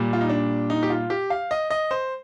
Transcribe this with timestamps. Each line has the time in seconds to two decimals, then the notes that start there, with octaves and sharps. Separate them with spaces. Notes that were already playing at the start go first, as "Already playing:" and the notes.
Already playing: A#2 G3
0.13 F4
0.21 D#4
0.30 D4
0.70 D#4
0.83 G4
0.90 F4
1.10 G4
1.30 F5
1.51 D#5
1.70 D#5
1.91 C5